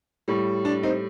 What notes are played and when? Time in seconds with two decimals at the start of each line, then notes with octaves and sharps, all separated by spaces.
0.28 A2 G3
0.65 D4
0.83 C4 D#4